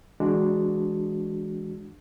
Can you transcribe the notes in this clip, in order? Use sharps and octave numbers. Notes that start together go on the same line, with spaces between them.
E3 G#3 D4 F#4